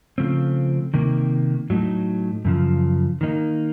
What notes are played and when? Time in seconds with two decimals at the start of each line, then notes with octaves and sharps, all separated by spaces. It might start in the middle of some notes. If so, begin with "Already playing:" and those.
0.18 C#3 F3 A3 C4
0.94 C3 D#3 A#3
1.70 A2 F#3 A3 D#4
2.45 F#2 C#3 F3
3.21 D#3 A#3 D#4